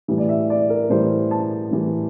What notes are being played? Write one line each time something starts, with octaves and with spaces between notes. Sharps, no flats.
A2 E3 G3
D5
E5
D5
A#4
A2 E3 G3 C5
A5
A2 E3 G3